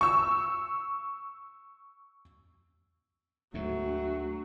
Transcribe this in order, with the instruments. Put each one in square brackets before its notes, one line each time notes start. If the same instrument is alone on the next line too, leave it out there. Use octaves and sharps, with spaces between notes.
[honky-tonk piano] C#6 E6
[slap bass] D2 G#2 [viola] F#3 [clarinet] A3
[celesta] D4